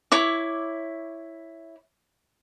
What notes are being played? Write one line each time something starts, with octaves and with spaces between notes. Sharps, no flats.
E4 C#5 D6